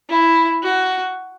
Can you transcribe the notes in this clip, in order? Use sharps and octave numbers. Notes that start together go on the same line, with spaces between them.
E4
F#4